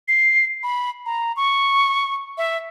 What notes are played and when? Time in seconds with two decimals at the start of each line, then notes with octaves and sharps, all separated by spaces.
0.08 C7
0.63 B5
1.06 A#5
1.36 C#6
2.38 E5